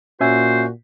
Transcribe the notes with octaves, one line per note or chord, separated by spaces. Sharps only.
A#2 C#4 F#4 C5 E5 G#5